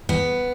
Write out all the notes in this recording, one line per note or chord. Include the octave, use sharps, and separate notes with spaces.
B3